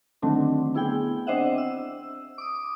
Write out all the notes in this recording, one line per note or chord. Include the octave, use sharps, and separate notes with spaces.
D3 D#3 F#3 A3 C4 D4
B3 E4 G#4 G5
C4 D4 C5 D#5 E5 F#5
E6
D6 D#6